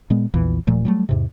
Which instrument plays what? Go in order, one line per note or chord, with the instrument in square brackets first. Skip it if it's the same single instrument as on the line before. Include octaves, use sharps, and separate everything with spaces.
[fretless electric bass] A#2 G#3 B3
A#1 E2 A#2 E3
D#1 A#2 F3 A3
F#3 G3 A3
E2 G#2 C3